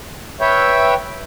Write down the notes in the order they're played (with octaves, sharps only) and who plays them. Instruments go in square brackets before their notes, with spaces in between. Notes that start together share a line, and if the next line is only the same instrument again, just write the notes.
[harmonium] B4 C#5 E5 G5